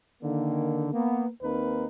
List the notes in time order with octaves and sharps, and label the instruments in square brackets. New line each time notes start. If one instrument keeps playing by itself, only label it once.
[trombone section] D3 D#3 A#3
A#3 B3
D#2 A#3 C4 D#4 A#4 B4